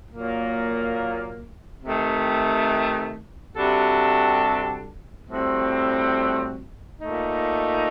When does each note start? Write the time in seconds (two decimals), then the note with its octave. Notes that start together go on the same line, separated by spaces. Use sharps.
0.12 A#2 F#3 A#3
1.83 C3 D#3 A3
3.55 C3 G3 D4 F#4 A4
5.27 A2 G3 C4 F#4
6.99 A#2 A3 D#4